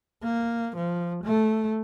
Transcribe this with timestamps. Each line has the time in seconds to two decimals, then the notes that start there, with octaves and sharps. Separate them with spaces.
0.23 A#3
0.76 F3
1.24 A3